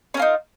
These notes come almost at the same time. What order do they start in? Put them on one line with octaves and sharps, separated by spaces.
C#4 A#4 F4 D#4